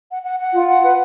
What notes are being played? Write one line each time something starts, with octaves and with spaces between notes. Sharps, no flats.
F#5
F#5
F#5
F4
F#5
B4